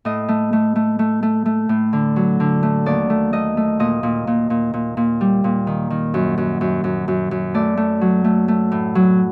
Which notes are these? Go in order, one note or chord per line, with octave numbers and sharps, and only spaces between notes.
A2 D#5
A3
A3
A3
A3
A3
A3
A2
D3
F#3
D3
A3
D#2 D5
A3
A3 D#5
A3
A#2 D#5
A#2
A#2
A#2
A#2
A#2
G3
A#2
D#3
D#3
F#2
F#2
F#2
F#2
F#2
F#2
A3 D5
A3
F#3
A3
A3
A2
F#3